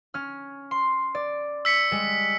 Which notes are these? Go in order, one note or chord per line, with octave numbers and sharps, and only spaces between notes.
C#4 F6
C6
D5
E6 B6 C#7
G3 G#3